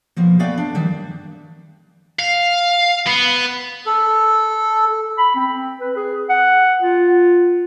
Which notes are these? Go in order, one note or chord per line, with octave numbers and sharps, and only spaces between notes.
B2 F3 A#3
A3 B3 D5 F5 G5
D4
D#3 G3
F5
B3
A4
B5
C4
B4
G#4
F#5
F4